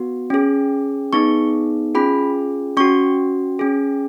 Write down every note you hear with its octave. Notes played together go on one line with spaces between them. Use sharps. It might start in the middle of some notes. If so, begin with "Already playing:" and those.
Already playing: B3 F#4
C#4 G#4
B3 D#4 G#4 C#6
C#4 F4 G#4 B5
C#4 F#4 C#6
C#4 G#4